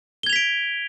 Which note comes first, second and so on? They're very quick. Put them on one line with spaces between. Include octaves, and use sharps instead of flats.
G7 G#6 F7 B6 D7